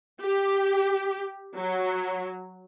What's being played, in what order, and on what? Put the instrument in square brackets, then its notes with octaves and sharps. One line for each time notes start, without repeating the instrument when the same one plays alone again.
[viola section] G4
F#3